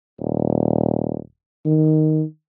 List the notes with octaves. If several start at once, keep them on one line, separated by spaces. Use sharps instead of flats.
D#1
D#3